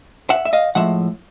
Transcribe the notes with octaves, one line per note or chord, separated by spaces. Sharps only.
E5 F#5
E5
D#5 F5
A2 F3 G#3 E5 F#5